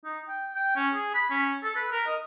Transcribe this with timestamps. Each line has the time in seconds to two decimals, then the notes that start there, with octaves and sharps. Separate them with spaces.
0.05 D#4
0.28 G5
0.55 G5
0.76 C#4
0.94 G#4
1.14 B5
1.30 C#4
1.63 A4
1.76 B4
1.92 A#4
2.07 D#5